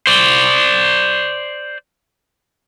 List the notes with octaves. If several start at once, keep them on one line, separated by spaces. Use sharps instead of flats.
C5 D5